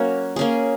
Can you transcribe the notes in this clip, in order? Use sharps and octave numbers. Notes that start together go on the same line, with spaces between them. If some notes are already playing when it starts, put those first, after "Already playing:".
Already playing: F#3 A#3 C#4 F#4 C#5
A#3 C#4 G#4